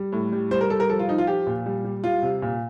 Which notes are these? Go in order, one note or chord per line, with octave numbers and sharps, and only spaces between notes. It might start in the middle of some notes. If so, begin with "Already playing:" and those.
Already playing: G3
A2
G3
G3 C5
A#4
G3 A4
A#4
F3 A4
F4
F3 D#4
F4
F3 G4
A#2
G3
G3
G3 F4
C3
A#2